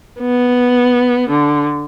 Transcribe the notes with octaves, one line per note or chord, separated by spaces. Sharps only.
B3
D3